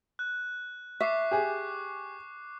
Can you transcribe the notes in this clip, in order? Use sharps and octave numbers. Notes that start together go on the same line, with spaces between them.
F#6
E5 C#6 D6 C7
G4 G#4